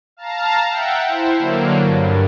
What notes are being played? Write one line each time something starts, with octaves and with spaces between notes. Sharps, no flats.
F5 A5 A#5
E5 F#5 G5
E4 C5
D3 F#3 A#3
G2